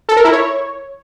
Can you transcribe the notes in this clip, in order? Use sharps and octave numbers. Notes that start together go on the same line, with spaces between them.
A4
A#4
E4
C#5